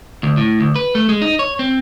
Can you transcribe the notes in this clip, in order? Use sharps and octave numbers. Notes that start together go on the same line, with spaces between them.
D2
A2
D2
B4
A3
G#3
D#4
C#5
C4